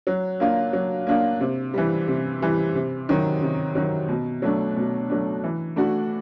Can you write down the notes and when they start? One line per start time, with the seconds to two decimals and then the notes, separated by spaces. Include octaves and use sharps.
0.07 F#3
0.40 A#3 D4 F4
0.73 F#3
1.07 A#3 D4 F4
1.41 C3
1.74 E3 G3
2.08 C3
2.42 E3 G3
2.75 C3
3.09 D#3 F#3
3.42 C3
3.75 D#3 F#3
4.09 B2
4.42 F#3 A3 D4
4.76 B2
5.10 F#3 A3 D4
5.44 E3
5.76 A3 D4 F#4